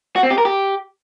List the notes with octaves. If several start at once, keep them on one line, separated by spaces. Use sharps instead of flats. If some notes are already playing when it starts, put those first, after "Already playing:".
F#4
C4
G4
A#4
G4